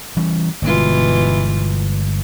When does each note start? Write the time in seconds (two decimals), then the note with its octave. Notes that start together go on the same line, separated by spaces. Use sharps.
0.16 E3 G3 C#4
0.62 G1 B2 E3 G#3 F4